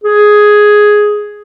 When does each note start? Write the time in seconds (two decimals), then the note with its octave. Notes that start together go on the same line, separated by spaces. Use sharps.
0.04 G#4